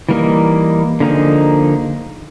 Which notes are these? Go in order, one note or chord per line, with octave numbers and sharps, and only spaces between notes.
E3 G3 A#3 D#4
D3 F3 A#3 D#4 G#4